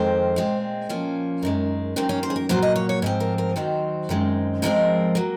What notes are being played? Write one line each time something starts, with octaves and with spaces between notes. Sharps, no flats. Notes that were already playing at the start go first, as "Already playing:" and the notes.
Already playing: F2 D#3 G#3 C4 C5
A#2 G#3 C4
A#2 F3 A#3 C#4
F#2 D#3 G#3
F#2 D#3 A#3 C4
C#4
C5
G#4
A#4
A#2 F#3 A#3 C5
D#5
C#5
C#5
G#2 F3 C4
A#4
A#4
D#2 D#3 F#3 C4 C5
F#2 D#3 G#3 C4
G#2 F3 G#3 C4 A#4
F#3 A#3